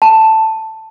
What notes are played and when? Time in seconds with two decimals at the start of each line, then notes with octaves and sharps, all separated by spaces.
0.02 A5